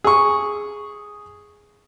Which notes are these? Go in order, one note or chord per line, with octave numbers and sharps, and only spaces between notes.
G#4 C#6